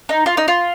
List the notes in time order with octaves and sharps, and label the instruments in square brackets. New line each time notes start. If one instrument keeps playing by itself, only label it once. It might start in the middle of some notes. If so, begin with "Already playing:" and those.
[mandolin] D#4
F4
D#4
F4